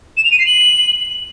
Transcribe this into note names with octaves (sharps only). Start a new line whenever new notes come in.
E7
F7
D#7
C7
F#7